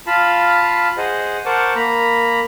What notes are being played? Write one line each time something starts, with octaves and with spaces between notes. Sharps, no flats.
F4 F5 A5 B5
G#4 C5 D#5 F#5
A#4 C5 F#5 A5 C#6 D6
A#3 A#5 B5